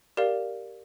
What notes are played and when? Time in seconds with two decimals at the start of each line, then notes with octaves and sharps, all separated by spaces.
0.17 G4 A#4 D5 F5